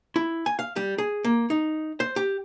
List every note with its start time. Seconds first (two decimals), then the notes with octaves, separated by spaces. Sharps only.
0.16 E4
0.46 G#5
0.59 F5
0.76 G3
0.98 G#4
1.24 A#3
1.50 D#4
2.00 C5
2.16 G4